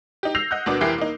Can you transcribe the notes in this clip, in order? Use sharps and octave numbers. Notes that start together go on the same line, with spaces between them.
D#4 G4
E6 G6 A#6 C7 F7
D#5 F#5 F#6 G6
D2 B2 B3 D4 A#4 D6
F1 E3 E4 G4 A#4 C7
A#3 D#4